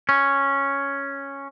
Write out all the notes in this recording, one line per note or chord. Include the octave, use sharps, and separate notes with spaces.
C#4